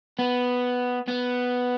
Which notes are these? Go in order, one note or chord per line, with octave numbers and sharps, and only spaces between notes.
B3
B3